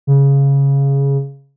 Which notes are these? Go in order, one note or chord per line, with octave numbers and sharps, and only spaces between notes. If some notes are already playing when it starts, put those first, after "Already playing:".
C#3